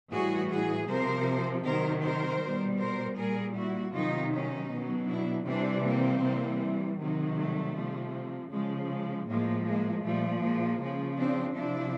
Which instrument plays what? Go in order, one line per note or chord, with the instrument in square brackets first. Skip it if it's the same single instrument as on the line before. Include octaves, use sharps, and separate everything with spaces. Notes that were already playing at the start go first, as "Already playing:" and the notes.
[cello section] A2 E3 G3 F#4 G#4
F#4 G#4
C3 F3 A#4 C5
C3 D#3 F#3 A#4 C5
A#4 C5
B2 G3
A#4 C5
A#2 G3 G#4 A#4
E4 F#4
C3 D#3 F#3 D#4 F4
C#4 D#4
B2 F#3
D4 E4
C3 E3 G3 C4 D4
A#3 C4
C3 E3 G3
C3 D#3 F#3
G3 A3
C3 F3
C#3 F3 G#3
G#3
A2 F3 G#3 A#3
G#3 A#3
A#2 F3 G3 A3
G#3 A#3
C#3 F3
C4 D4
C3 F3 D4 E4